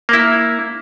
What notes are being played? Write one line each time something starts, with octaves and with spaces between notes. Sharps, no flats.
A#3 E4